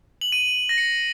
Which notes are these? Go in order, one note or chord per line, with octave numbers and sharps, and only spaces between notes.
F#7
D#7
A#6
C#7